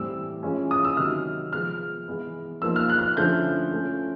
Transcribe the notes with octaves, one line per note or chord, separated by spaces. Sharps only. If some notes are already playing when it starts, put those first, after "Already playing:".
Already playing: A2 E3 G3 C4 E6
E3 G#3 C#4 F4
D#6
E6
C3 D#3 F#3 F6
F3 G#3 B3 F6
E3 G#3 B3
F3 A#3 D#4 E6
F6
F#6
F6
F#6
D3 F3 A3 C#4 E4 G6
F3 A3 C#4